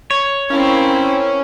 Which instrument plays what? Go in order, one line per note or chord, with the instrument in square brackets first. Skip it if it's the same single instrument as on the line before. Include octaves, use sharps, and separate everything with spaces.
[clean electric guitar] C#5
[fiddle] C4 E4 [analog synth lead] C#4 [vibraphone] A#4 F5 A#5